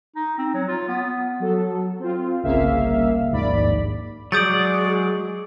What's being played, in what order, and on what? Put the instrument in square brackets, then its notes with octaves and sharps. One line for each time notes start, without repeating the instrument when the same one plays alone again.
[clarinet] D#4
C4
F#3
F4
B3
[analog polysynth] F#3 A4
C4 F4
G1 C2 C#3 A#3 E5 F5
A#1 D#2 G#2 D5 B5
[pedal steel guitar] F#3 G#3 D5 [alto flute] G#4 [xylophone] D#6 G6 A6